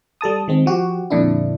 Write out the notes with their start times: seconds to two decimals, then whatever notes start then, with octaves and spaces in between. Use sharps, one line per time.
0.21 G3 A4 A5 D#6
0.48 D#3 G#3 C4
0.66 F3 F#4 G4
1.10 F2 A#2 D3 D4 E4